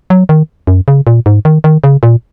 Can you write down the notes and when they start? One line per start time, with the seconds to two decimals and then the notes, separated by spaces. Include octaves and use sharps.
0.10 F#3
0.29 D#3
0.67 F#2
0.88 C#3
1.07 A#2
1.26 G#2
1.45 D#3
1.64 D#3
1.84 C#3
2.03 A#2